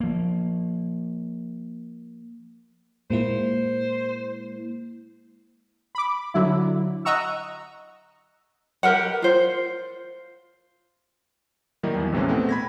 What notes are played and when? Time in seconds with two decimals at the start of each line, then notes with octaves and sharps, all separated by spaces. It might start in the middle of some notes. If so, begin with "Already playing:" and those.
0.01 F3 A#3
3.10 A#2 G#3 A#3 E4 C5
5.95 B5 D6
6.34 D3 F#3 E4
7.05 D#5 F#5 A#5 C#6 E6
8.83 G4 A#4 B4 F#5
9.22 F4 C5
11.83 D#3 F#3 G3 A#3 D#4 E4
11.95 E2
12.12 A#1 C3 E3 G#3 C#4
12.29 A3 B3 C4
12.49 B5 G#6 A#6